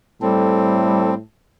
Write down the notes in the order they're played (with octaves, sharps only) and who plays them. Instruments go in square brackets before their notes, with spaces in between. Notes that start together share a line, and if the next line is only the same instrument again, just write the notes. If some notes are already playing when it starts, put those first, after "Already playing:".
[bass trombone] A2 [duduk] G3 [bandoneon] C4 [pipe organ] A4